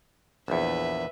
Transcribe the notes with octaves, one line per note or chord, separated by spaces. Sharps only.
A#1 E2 B4 E5